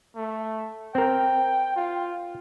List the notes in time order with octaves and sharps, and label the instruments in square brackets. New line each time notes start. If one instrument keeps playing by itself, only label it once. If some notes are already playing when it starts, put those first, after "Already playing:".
[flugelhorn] A3
[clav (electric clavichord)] C4 A#4 [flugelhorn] G5
[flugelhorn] F4